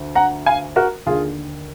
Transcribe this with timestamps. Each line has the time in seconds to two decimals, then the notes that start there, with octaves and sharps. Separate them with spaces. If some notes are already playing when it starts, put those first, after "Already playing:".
Already playing: D2
0.15 F#5 A#5
0.46 F5 G#5
0.76 F#4 A#4
1.06 D#2 D3 F4 G#4